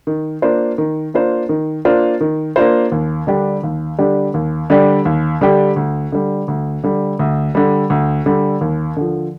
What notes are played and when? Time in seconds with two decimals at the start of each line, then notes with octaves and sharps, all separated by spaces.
0.07 D#3
0.42 A#3 D4 F4 C5
0.78 D#3
1.14 A#3 D4 F4 C5
1.49 D#3
1.85 A#3 D4 F4 C5
2.21 D#3
2.56 A#3 D4 F4 C5
2.92 D#2
3.27 D3 G3 D4 G4
3.63 D#2
3.99 D3 G3 D4 G4
4.34 D#2
4.70 D3 G3 D4 G4
5.05 D#2
5.41 D3 G3 D4 G4
5.76 D2
6.12 D3 G3
6.48 D2
6.84 D3 G3
7.19 D2
7.55 D3 G3
7.90 D2
8.26 D3 G3
8.61 D#2
8.97 D3 F3